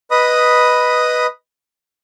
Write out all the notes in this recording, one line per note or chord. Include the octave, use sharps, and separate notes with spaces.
B4 D#5 B5 D#6